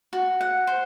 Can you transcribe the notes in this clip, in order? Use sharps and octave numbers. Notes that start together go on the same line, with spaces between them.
F#4
F#5
C5